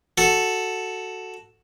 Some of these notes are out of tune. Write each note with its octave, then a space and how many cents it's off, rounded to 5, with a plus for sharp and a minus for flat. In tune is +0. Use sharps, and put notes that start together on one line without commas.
F#4 +0 A4 +0